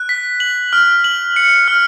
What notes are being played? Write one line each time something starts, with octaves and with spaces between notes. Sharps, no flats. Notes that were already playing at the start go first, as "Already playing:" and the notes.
Already playing: F#6
B6
F#7
F6
F#7
C#7
F6